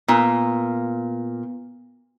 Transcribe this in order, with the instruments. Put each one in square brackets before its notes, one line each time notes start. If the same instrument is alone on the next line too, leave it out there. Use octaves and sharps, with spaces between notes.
[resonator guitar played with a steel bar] A#2 [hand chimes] B3